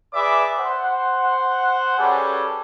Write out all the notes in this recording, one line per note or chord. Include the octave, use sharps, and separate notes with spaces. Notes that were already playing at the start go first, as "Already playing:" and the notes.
G#4 B4 D5 E5 D6
C5 F#5
G3 C#4 G#4 A4 B4